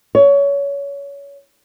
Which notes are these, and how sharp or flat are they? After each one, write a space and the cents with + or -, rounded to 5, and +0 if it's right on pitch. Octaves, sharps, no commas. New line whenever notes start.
C#5 +25